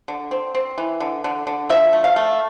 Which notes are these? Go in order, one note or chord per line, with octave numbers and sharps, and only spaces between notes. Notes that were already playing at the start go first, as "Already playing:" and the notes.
D3
C4
C4
E3
D3
D3
D3
F3 E5
A3
F5
A3